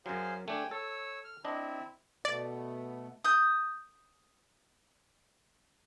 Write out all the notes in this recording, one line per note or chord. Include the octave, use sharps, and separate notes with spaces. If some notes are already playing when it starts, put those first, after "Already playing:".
F#2 F#3 G#4 C5 F5
A3 D4 G5 G#5
A4 C#5 E6
F6
C4 D4 E4 D#5
B2 A3 B3 D5
D#6 G6